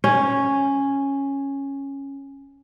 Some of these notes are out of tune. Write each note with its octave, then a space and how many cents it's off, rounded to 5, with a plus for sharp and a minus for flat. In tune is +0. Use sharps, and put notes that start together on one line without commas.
C#4 -5